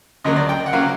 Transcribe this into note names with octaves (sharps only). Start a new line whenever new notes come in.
D2 C#3 F#3 A#3 D#5
D5
G5
F#5
C#3 F#3 A#3 F5